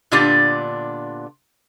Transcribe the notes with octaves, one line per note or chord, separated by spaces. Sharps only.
A#2 D3 B3 D4 F4 G4